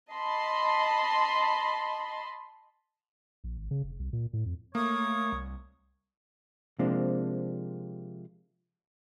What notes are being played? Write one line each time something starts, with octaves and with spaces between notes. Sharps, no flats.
D#5 A5 B5 C6
A#1
G#1
C#3
F1
C2
A#2
A2
F2
A3 A#3 C#5 D#6
C2
C3 F3 G#3 A#3 C4 D4